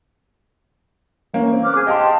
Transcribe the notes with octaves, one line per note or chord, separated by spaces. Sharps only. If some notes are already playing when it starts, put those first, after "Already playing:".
E3 A#3 C#4
C4
D6 F6 F#6
G#4
G4 D#5 F5 A5 C6